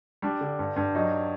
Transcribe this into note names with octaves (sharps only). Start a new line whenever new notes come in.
G3 D4
D3
G2
G2
F#3 D#4